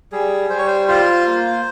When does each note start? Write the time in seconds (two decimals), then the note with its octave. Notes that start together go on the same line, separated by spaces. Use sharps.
0.12 G3 G#4
0.50 G3 C5
0.58 C#5
0.67 C5
0.88 F4 C5
1.26 A#3